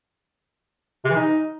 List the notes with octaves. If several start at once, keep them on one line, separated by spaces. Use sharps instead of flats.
C3
E3
D#4